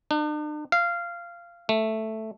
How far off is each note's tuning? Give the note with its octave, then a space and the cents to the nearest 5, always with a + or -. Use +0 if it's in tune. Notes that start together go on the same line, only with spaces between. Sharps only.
D4 +45
F5 -15
A3 +0